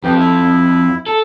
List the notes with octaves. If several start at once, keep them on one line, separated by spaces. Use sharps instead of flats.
F2 E3 F3 G4
E4
A4